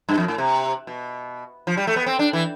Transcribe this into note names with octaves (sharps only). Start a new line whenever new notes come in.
G2
F2
A2
C3
B2
F3
G3
A3
B3
C4
D4
E3